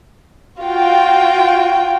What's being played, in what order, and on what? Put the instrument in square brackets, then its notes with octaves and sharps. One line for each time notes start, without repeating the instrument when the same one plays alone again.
[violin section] F4 F#4 G5